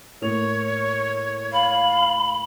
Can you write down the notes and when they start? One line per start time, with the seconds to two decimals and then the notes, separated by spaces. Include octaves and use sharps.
0.21 A2 A#3 C#5 F7
1.53 F5 B5